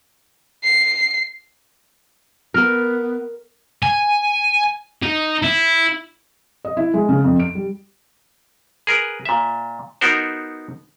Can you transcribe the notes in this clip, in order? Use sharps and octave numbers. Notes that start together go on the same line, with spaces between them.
C7
B3 A#4
G#5
D#4
E4
D#5
E4
G#3
C#3
F2
D7
G3
G#4 A#4 B4
A#2 E5
B3 D#4 F#4 A#4 C5